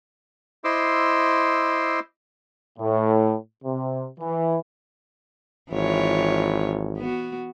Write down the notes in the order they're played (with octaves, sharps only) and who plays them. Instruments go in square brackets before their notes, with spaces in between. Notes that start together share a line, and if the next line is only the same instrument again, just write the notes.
[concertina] E4 C5 D#5 C6 D6 E6
[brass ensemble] A2
C3
E3
[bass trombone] G#1 [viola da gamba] E3 F4 C#5
[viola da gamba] B3 F#4